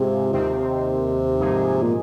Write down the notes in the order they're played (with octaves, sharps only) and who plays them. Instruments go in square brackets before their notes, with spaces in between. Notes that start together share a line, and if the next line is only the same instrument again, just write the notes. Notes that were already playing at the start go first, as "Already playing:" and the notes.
Already playing: [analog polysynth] G#2 G#3 C4 F4 G#4 [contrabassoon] C3
[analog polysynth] D#2 D#3 C4 [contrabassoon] C3
[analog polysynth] G#2 F3 A#3 D#4 G#4
[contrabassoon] A#2